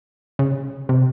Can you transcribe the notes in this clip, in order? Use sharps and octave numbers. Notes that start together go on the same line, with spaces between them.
C#3
C3